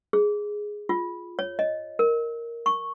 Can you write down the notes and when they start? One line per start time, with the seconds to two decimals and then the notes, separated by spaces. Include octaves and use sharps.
0.13 G#4
0.89 F4
1.39 C#5
1.59 D#5
1.99 A#4
2.66 C#6